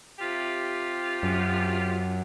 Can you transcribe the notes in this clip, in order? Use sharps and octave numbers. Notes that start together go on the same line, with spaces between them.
C3 F4 G4
F#2